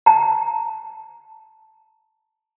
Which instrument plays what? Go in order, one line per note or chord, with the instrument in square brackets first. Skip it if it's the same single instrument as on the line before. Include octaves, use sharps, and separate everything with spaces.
[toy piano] A5 A#5